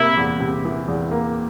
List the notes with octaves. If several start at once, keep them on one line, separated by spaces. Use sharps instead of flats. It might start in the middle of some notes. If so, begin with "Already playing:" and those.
Already playing: C3 A#3 E4
E2
C3
E3
E2
A#3